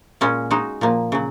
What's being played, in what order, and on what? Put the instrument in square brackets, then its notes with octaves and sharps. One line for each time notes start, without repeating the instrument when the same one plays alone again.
[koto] A#2 G#3 C#4
G#3 D#4 F#4
A#2 F3 A#3
C#3 F#3